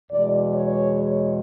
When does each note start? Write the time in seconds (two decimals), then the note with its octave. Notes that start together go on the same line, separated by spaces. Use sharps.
0.10 E2 B2 G#3 D5
0.54 C#5